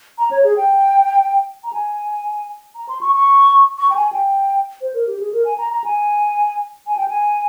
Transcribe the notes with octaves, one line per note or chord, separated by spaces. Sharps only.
A#5
C#5
G#4
G5
A#5
G#5
A#5
C6
C#6
C#6
C#6
G5
G#5
G5
C5
A#4
G4
G#4
A#4
G#5
A#5
A#5
G#5
G#5
G5
G#5